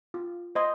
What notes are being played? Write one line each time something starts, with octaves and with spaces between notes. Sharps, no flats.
F4
C5 D#5 C6